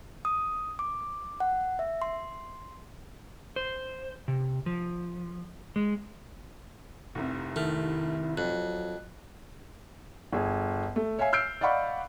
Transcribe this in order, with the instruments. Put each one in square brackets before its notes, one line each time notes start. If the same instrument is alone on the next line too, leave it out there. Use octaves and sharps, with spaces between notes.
[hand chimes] D#6
D6
F#5
E5
C6
[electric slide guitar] C5
C3
F3
G#3
[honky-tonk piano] F1 C2 C3
[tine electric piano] D#3 F6 [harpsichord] A3 [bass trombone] E4
[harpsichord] F2 [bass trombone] F#3 [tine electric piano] F#6
[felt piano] G1 G#4
A3
C#5 E5 F5 G#5 C7
E6 F6 G6 C7 D7
D5 D#5 F5 F#5 B5 C#6